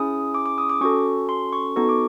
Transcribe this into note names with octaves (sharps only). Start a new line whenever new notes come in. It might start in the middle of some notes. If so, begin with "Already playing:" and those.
Already playing: C#4 E4 G#4 D#6
D6
D6
D#6
D6
C#4 F#4 A4 C#6
C6
C#6
B3 D#4 F#4 A4 C#6
D6